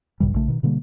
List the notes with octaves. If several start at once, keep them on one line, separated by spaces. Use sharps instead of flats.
A#1 G2 C#3 G3
A#1 C#3 A3
B2 D#3
B2 D3 G3 A#3